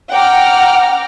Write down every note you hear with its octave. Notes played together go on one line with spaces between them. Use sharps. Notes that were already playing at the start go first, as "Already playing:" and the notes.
F#5 G5 A#5 D6 F6